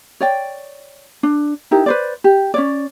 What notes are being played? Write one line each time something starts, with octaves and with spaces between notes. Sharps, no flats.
C#5 D5 G5
D4
D#4 E4 G4 A#4
B4 C5 D5
G4
C#4 C#5 D5